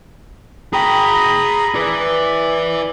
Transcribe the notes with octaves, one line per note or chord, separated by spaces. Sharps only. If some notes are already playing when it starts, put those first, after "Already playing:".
G#4 G5 A#5 B5 D#6
E4 B4 D5